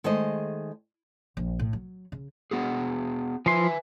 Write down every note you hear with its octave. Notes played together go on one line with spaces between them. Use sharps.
D#3 G#3 A3 G#4 C5 D#5
A#1
A2
F#3
C#3
B3 F#4 G#4
F3 B4 E5 G#5 C6